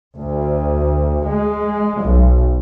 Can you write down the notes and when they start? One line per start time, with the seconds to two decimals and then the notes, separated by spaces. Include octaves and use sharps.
0.17 D2
1.26 G#3
2.03 B1